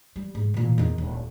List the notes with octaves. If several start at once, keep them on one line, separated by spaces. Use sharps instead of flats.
G3
G#2
A#2 E3
E2 D#3
D#1